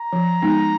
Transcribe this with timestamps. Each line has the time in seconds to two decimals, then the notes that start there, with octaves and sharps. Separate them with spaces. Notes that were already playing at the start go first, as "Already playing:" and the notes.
Already playing: A#5
0.13 F3
0.42 G#3 B3 D#4